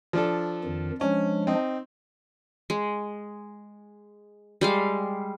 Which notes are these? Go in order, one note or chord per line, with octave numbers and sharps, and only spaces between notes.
F3 D4 A4
F2 D#3
F3 G#3 C#4 D4
C4 D#4
G#3
G3 G#3 F5